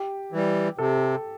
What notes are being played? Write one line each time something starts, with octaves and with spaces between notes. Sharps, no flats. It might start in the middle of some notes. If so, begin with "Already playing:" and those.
Already playing: G4
E3 G3
C3 A4